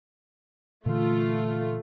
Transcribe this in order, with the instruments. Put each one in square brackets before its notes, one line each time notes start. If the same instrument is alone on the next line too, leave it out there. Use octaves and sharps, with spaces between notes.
[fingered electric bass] A#2 D3 E3 [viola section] A3 F4